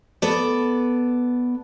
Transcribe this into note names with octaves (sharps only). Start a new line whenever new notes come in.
B3 A4 D5